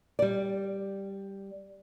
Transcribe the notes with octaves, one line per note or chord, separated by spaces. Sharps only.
G3 D5